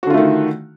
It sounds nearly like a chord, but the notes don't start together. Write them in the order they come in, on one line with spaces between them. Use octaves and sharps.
F#4 D3 F4 A3 D#3